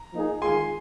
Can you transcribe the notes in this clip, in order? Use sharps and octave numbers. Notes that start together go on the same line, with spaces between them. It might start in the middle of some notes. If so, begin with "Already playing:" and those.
Already playing: A#5
F3 A#3 D#4 G#4
D#3 G#3 F4 G#4 G#5 C6